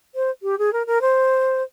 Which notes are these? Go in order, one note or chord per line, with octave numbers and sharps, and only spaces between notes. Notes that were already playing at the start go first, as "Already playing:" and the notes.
C5
G4
G#4
A#4
A#4
C5